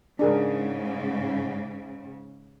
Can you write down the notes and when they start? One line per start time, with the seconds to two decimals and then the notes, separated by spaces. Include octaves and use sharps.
0.19 G#2 C#3 D4 G#4 A#4